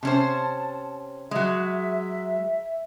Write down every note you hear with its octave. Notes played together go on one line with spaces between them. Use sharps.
C3 C#4 C5 A5
F#3 G#3 E5